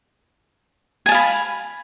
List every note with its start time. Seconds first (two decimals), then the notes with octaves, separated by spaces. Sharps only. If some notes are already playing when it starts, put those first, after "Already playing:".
1.06 G#5
1.09 A5
1.12 F5
1.14 B5